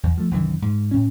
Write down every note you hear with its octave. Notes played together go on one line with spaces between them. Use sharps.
E2
F3 A3
C2 F#2 D#3 E3
G#2
A2 C#4